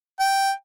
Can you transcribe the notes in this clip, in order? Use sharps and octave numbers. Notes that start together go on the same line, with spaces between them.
G5